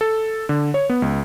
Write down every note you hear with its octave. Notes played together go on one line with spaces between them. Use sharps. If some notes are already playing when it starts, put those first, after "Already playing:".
A4
D3
C#5
B3
C#2